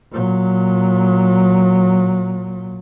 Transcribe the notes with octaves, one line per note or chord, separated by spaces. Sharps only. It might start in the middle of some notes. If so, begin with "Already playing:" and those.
A#2 F#3